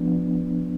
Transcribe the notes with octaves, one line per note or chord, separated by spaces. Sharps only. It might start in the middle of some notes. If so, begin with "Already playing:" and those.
Already playing: F3 B3 D4